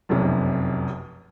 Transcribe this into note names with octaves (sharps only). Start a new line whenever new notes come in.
F1 B1 F#2 C3